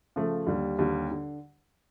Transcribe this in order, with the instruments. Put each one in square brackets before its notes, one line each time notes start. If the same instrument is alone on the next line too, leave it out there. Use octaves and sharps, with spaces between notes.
[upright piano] C#3 F3 A3
D#2 D3 G3
D#2 D3 G3
D3